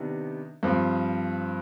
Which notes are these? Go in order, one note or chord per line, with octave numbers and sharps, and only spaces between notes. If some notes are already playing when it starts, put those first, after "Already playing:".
Already playing: C3 D#3 B3 D4
G2 F3 C4